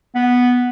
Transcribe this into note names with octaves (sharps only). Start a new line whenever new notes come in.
B3